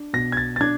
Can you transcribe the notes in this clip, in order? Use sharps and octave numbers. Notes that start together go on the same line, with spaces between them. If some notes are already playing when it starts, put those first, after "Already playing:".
Already playing: D4
B2 A#6
G#6
A6
A6
D4 G#6